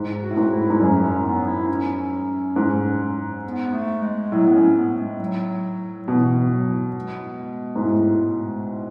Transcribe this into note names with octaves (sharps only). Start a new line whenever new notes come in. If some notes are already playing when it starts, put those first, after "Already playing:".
Already playing: G#2
F#4
A2
G#2
E4
G#2
F#2 C#4
C#4
B3
E4
C#4
G#2
B3
A3
G#3
A2 F#3
B3
C#4
B3
G#3
F#3
B2 E3
F#3
G#3
G#2
A2